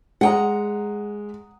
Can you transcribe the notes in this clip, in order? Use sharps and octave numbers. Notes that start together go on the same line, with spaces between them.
G#3 F#5 G5 A#5 D#6